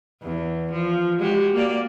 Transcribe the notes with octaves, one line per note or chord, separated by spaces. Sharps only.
E2
F3
G#3 F#4 G4
A#3 D5